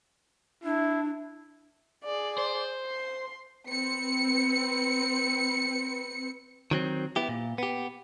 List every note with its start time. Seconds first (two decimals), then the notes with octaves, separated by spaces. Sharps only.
0.64 D4 E4
2.04 G#4 D5
2.38 C5
2.87 C6
3.69 C4 B4 C#7
6.71 D#3 F#3 C4
7.16 B3 E4 G4
7.29 A#2
7.58 B3 G4